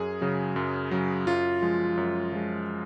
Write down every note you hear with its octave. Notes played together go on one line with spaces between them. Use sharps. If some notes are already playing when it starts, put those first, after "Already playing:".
Already playing: F#2 G#4
C#3 F#3
F#2
C#3 F#3
F#2 F4
F3 G#3
F#2
F3 G#3